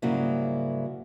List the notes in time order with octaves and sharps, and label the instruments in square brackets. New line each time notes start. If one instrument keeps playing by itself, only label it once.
[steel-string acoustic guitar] G#2 C#3 F#3 G3 A#3 E4